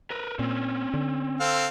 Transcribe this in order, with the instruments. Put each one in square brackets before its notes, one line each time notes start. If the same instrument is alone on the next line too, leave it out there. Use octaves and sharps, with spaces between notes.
[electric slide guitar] A#4 B4
[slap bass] A#2 [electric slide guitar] C4 C#4
[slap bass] D3
[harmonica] C4 A4 F5